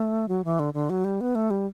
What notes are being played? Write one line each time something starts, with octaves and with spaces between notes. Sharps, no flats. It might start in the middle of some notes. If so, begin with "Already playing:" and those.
Already playing: A3
F#3
E3
D3
D3
F#3
G3
B3
A3
G3